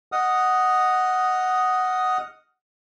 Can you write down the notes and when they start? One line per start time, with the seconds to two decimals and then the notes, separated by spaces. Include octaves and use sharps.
0.12 D#5 F#5 D#6 F6